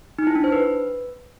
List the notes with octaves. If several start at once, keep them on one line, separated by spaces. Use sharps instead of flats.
D#4
E4
D4
C5
B4